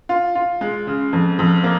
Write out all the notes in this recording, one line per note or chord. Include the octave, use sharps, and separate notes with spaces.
F4
F4
G#3
C#3
F2
F2
A#3